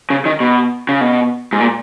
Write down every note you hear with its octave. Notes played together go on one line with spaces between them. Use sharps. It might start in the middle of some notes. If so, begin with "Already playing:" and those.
C#3
D#3
B2
C#3
B2
G#2
A#2